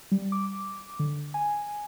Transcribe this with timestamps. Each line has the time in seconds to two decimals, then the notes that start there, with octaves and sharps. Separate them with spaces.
0.12 G3
0.32 D6
0.99 D3
1.34 G#5